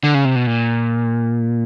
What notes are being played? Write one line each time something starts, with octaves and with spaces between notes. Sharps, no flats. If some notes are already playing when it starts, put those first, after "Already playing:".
D3
C#3
C3
B2
A#2